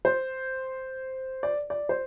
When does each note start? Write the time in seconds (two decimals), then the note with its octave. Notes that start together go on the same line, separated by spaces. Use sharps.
0.05 C5
1.43 D5
1.70 D5
1.89 C5